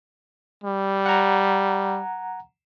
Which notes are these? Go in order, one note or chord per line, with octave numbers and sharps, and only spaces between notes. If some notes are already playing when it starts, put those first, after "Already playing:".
G3
F#5 A#5